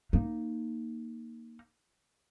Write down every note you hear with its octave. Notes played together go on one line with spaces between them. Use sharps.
A#3 D#4